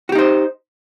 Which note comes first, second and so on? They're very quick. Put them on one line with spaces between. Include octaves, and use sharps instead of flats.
F#4 G4 D#4 C5